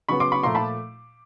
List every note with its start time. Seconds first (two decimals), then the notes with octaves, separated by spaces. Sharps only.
0.09 C#3 F#3 B3 B5 C#6
0.20 C6 D6
0.32 B5 C#6
0.43 A#2 F3 A3 A#5 C6
0.55 A5 B5